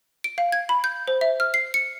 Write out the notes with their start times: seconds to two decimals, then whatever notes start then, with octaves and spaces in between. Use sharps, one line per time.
0.24 D7
0.38 F5
0.52 G#6
0.69 B5
0.84 G6
1.08 C5
1.21 E5
1.40 F6
1.54 C7
1.74 C#7